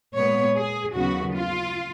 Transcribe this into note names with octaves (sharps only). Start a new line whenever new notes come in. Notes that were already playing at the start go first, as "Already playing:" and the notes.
A#2 G#3 B3 C#5
G#4
D#2 C#3 F#3 B3 F#4
F4